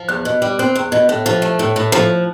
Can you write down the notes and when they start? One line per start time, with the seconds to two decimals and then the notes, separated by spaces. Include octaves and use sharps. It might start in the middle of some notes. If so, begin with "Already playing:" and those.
Already playing: F3
0.09 E2 F#6
0.25 B2
0.42 G3
0.59 C4 F#6
0.75 E2
0.92 B2
1.09 A2 F#6
1.26 F3
1.42 A3
1.59 A2
1.76 A2
1.92 F3